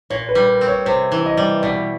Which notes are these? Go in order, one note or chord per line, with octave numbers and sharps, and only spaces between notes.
A#2 C#5
B4
G3
A#4
C4
C#5
C3 C5
E3
D#5
G3 D5
B2 D5